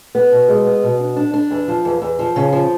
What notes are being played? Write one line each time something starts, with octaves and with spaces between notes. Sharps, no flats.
B3
B2
G#3
B3
B2
D4
D4
D4
E2
F3
E2
E2
F3
C#3
F3